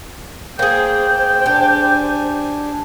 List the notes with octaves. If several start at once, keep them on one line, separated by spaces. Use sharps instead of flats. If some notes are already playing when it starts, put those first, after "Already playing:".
A#3 G#4 C5 G5
D4 G4 G#5